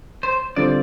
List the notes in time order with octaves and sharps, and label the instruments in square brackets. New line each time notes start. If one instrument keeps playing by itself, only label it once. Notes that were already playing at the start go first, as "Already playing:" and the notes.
[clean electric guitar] C5
[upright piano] D3 G3 C4 F4 C5 [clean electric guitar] D5